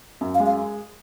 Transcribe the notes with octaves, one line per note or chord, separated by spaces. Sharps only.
F#2
F5
G#3
F5